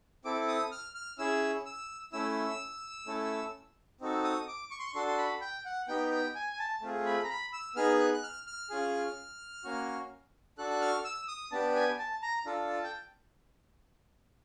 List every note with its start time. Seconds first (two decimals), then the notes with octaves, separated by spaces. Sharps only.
0.25 C4 E4 A4 D6
0.48 D#6
0.72 F6
0.95 F6
1.18 C#4 E4 G#4 E6
1.66 E6
2.13 A3 C#4 E4 E6
3.06 A3 C#4 E4 A4
4.00 C4 D#4 F#4 A4
4.24 D#6
4.48 D6
4.71 C#6
4.79 C6
4.86 C#6
4.95 D4 F#4 A4 C6
5.08 C6
5.18 B5
5.41 G5
5.65 F#5
5.88 B3 D#4 G4 G5
6.12 G5
6.35 G#5
6.52 G#5
6.59 A5
6.82 A3 C4 F4 G#4
7.06 B5
7.24 A#5
7.30 B5
7.53 E6
7.76 B3 D#4 G#4 F6
8.00 F#6
8.14 F#6
8.23 F6
8.47 F6
8.70 C#4 F4 G#4
9.64 A#3 C#4 F#4
10.58 D4 F#4 A4 F#6
10.70 F#6
10.81 F6
11.05 E6
11.28 D#6
11.52 B3 D4 G4 A5
11.75 G#5
11.99 A5
12.22 A#5
12.46 D4 F4 A4
12.69 A5
12.84 G5